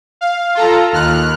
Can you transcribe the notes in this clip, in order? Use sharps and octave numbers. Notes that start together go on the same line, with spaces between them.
F5
F4 A4 A#5
D#2 F6 F#6